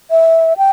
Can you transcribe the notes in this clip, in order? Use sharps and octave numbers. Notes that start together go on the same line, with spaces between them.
E5
G5